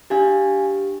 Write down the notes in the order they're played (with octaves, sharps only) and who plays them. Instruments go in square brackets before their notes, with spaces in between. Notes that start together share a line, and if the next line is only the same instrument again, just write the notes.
[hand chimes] D4 G4 F5 G#5